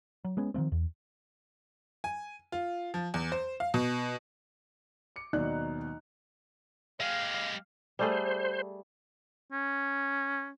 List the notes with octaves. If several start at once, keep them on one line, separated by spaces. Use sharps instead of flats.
F#3
G#3 B3 C#4
D#3 F3 A3 C4
E2
G#5
F4
F3
E2
C5
F5
B2
D6 C#7
D#2 B2 F#3 D#4 D5 F#6
G#3 G4 F5
G3 A3 G#4 C5
C#4